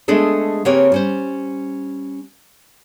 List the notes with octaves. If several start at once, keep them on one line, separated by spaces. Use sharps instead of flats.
G#3 A3 B3 D4 G#4 A4
C#3 A#3 C4 G4 B4 C#5
G3 C#4 C5